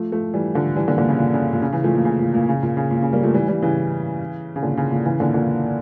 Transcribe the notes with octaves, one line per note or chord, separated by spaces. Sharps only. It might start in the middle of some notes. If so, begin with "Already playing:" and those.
Already playing: F3 A3
F3 A3
E3 G3
D3 F3
E3 G3
A#2 D3
A#2 D3
C#3
A#2
C#3
A#2
C#3
C#3 E3
F3 A3
A#2
C#3
A#2
A#2
C#3
A#2
C#3
A#2
C#3
G3 A#3
F3 A3
E3 G3
E3 G3
C#3 E3
C#3
A#2 D3
C#3
A#2
C#3 E3
A#2 D3
A#2 D3